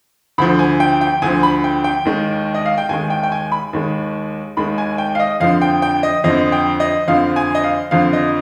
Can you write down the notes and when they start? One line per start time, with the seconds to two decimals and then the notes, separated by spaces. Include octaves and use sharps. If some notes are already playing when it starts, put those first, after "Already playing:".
0.38 D2 D3 F3 B5
0.59 G#5
0.80 G5
1.01 G5
1.22 D2 D3 F3 G#5
1.43 B5
1.64 G5
1.84 G5
2.05 D#2 D#3 G#3
2.54 D#5
2.66 F5
2.78 G5
2.89 D#2 D#3 G#3 G#5
3.10 G5
3.23 G5
3.32 G#5
3.52 B5
3.73 D#2 D#3 G#3
4.57 D#2 D#3 G#3 B5
4.78 G#5
4.98 G5
5.15 F5
5.19 D#5
5.40 F2 D3 F3 F5
5.62 G5
5.82 G5
6.03 D#5
6.24 F2 D3 F3 D#5
6.52 G5
6.80 D#5
7.08 F2 D3 F3 F5
7.36 G#5
7.55 D#5
7.64 F5
7.91 F2 D3 F3 F5
8.13 D#5